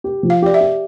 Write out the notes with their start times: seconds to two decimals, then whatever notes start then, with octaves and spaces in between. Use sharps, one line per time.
0.04 G4
0.23 F3
0.30 F5
0.42 G4 D5
0.54 E5
0.61 G4